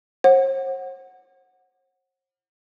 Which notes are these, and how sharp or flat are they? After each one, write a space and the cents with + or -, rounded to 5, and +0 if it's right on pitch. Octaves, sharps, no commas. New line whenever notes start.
C5 +45 F#5 +0